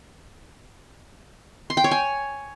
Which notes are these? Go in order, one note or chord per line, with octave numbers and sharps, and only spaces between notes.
C6
G5
C#5
G#5